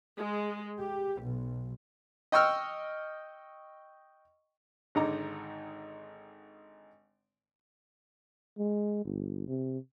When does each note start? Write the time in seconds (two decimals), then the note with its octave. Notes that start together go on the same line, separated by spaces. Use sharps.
0.17 G#3
0.80 G4
1.24 B1
2.32 D#5 G5 C#6 E6 F6
4.95 G#1 G#2 D3 D#4 A#5 D6
8.58 G#3
9.05 G1
9.47 C3